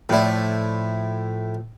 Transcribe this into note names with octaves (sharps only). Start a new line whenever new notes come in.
A2 F3 A3 E4 D5